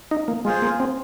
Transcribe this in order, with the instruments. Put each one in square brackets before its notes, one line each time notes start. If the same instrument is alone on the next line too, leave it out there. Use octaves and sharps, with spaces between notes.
[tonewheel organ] D#4
A#3
[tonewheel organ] G#3 [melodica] F4 G#4 C5
[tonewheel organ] A#3
C4